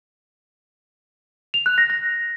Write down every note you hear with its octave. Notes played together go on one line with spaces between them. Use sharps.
F7
F#6
A#6
A#6